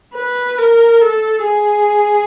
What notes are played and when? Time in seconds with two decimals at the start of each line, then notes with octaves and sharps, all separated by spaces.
0.15 B4
0.58 A#4
1.02 A4
1.44 G#4